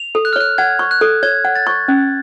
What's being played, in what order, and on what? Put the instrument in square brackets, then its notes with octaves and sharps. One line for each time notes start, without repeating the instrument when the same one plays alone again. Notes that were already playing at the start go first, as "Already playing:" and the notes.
Already playing: [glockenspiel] F7
[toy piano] A4
[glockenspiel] F#6
F6
[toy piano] C#5 [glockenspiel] F#6
[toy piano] F#5 [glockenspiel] G#6
[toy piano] C#6
[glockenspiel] F#6
[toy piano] A4
[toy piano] C#5 [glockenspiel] G#6
[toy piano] F#5
[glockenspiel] A6
[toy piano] C#6
C#4